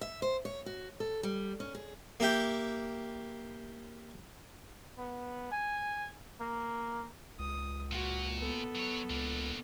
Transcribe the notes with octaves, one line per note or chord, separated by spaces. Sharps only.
E5
C5
C#5
F#4
A4
G3
C#4
G#4
A#3 E4 G4 G5
B3
G#5
A#3
C#2 D#6
A#2 F#4
B3 A4
F#3 C#5
C#2 A#3 D4